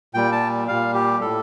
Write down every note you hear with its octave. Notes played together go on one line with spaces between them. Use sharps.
A#2 G3 G5
A5
A#2 G3 F5
G4
A2 G3 A4